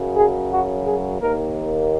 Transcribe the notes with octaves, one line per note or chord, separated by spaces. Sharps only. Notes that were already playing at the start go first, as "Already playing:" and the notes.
Already playing: F#2 C#3 F#3
G#4
F#4
G#4
D#2 D#3 A#3 A#4